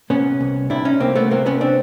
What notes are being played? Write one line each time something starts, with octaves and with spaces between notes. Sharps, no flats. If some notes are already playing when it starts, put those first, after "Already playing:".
C3 B3 C#4
C2
C3 D4 E4
C#4 D#4
C2 A#3 C4
A3 B3
C3 A#3 C4
B3 C#4
C4 D4